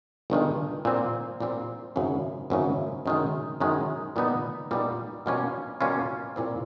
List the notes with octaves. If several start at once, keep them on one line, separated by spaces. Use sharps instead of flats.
G1 G2 D#3 G#3
A#2 G3 C4
A#2 G3 C4
G#1 F#2 C#3
G#1 F#2 C#3
F#2 D#3 G#3
F#2 D#3 G#3
A#2 G3 B3 D#4
A#2 G3 B3 D#4
B2 G3 A#3 C#4 F4
B2 G3 A#3 C#4 F4
C2 A#2 G3 C4